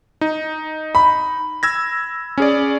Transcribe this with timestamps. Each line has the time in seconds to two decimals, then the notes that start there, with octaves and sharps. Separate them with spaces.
0.21 D#4
0.95 B5
1.63 E6 G#6 A#6
2.38 C#4 G#4 D5